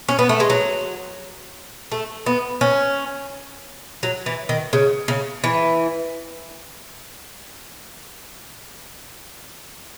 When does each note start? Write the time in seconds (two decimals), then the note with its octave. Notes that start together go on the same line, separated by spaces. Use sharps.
0.08 C#4
0.19 B3
0.29 A3
0.40 G#3
0.50 F#3
1.92 A3
2.26 B3
2.61 C#4
4.03 F#3
4.26 E3
4.49 D#3
4.73 C#3
5.08 C#3
5.44 E3